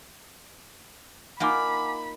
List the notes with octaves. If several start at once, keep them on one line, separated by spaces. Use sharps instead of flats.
A#3 D#4 F4 F#5 G#5 B5 D6